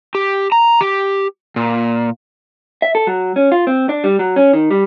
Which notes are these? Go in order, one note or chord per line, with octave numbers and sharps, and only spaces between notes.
G4
A#5
G4
A#2
E5
A4
F#3
C#4
F4
C4
D4
G3
F#3
C#4
D#3
G3